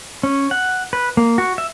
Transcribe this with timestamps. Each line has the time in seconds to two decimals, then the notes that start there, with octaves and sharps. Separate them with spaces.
0.23 C#4
0.51 F#5
0.93 B4
1.17 A#3
1.38 F#4
1.58 E5